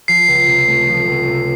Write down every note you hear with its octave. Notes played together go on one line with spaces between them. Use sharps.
F3 C7
C#2
C3
A3
F3
C#2
C3